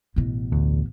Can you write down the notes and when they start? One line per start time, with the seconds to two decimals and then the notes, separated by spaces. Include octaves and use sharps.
0.16 A1 B2
0.52 D2